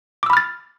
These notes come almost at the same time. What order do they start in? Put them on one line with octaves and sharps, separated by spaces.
D6 E6 B5 F6 A6